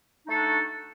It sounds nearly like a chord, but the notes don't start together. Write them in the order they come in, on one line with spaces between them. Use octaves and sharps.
D#4 A3 A4 F#4 D4